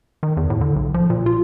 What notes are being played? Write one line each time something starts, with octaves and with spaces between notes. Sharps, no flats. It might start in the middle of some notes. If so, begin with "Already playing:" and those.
D#3
E2
A2
D3
B1
F3
A#2
F4